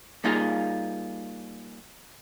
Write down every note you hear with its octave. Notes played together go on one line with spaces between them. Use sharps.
G3 A#3 D#4 F4 G#4 F5